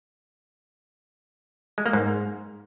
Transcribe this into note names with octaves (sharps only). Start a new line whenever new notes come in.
G#3
A#3
G#2